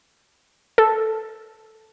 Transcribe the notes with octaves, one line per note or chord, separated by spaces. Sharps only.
A4